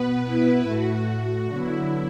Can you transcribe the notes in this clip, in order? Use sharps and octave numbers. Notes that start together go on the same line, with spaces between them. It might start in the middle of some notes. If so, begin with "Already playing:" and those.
Already playing: B2 B3 B4
E4
A2 A3 F#4
D3 F#3 B3 E4